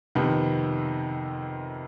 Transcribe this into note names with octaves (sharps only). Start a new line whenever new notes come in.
F2 C3 D#3 B3